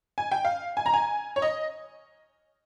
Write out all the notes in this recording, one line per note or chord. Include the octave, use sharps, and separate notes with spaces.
G#5
G5
F5
G#5
A#5
G#5
C#5
D#5